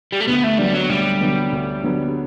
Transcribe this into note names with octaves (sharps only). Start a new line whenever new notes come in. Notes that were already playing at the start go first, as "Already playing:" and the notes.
G3
A3
D2 B3
A3
D3 F#3 G3 B3
F#3
D2 G3
D3 F#3 B3
D2
D3 F#3 B3